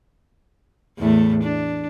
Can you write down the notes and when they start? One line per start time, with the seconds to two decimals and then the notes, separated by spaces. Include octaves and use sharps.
0.98 E2 A2 A3
1.43 D4